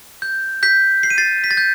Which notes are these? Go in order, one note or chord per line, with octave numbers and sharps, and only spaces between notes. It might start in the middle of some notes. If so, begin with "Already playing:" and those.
G6
G6 B6
C7
D#7
A6 C7
B6
A6
G6